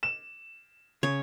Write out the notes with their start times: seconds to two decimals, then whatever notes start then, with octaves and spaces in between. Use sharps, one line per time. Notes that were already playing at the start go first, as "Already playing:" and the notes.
0.03 E7
1.03 C#3 C#5